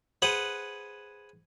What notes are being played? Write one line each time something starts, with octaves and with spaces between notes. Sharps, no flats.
G#4 B4 C5 F#5